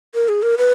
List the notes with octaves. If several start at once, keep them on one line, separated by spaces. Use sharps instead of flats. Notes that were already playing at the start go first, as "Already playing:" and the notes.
A#4
G#4
A#4
B4